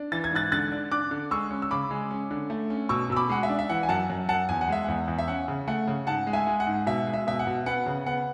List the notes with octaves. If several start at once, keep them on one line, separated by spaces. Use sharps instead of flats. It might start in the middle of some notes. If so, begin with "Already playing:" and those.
Already playing: D4
E3 A6
G#6
G#2 F#6 A6
D3 F#6 A6
D4
D4 D6 F#6
D3
G#3 C#6 E6
C#4
E6
C#3 B5 D6
G#3
C#4
D3
A3
C#4
B2 C#6 E6
B2 E6
B5 D6
G#3 F#5
E5
D4
E5
E3 F#5
G#5
F#2 F#5 A5
F#2
F#2 F#5 A5
E2 G#5
F#5
G#3 E5
E2 F#5
E2
E5
C#4 F#5
C#3
A3 F#5
C#3
G#2 F#5 A5
G#3
E5 G#5
G#3
F#5
G#2
B2 E5
G#3
E5
B2 E5
F#5
B2
B3 F#5
C#3
B3 F#5